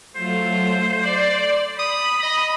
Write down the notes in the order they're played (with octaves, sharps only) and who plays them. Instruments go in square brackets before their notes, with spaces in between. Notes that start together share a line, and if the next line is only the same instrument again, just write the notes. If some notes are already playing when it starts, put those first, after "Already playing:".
[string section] F#3 A3 F4 [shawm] C5
[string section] D5
[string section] B5 [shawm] D#6
[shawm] D#5